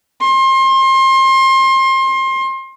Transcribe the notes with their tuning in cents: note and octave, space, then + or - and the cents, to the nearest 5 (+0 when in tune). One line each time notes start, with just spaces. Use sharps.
C6 +30